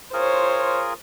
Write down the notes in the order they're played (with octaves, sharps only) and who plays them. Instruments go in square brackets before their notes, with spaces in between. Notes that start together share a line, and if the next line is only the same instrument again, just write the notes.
[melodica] F4 G#4 A#4 [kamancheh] C5 C#5